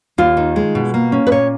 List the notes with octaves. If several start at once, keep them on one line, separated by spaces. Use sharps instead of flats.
D#2 F4
D#3
G#3
B2
A#3
C#4
B4
A#2 C#5